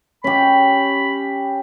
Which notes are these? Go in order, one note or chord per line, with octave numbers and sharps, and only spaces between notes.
C#4 G4 B5